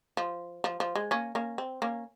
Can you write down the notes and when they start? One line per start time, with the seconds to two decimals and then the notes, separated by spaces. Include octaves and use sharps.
0.17 F3
0.64 F3
0.80 F3
0.96 G#3
1.11 A#3 C#4
1.35 A#3 C#4
1.58 C4
1.82 A#3 C#4